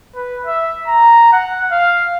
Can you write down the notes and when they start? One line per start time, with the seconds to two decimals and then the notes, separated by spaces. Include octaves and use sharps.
0.15 B4
0.46 E5
0.88 A#5
1.33 F#5
1.72 F5